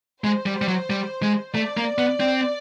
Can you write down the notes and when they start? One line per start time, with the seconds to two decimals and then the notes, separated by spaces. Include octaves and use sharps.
0.24 G#3 C5
0.46 G3
0.61 G3
0.68 F#3
0.90 G3
1.22 G#3
1.55 A3 D5
1.77 A#3
1.98 B3
2.20 C4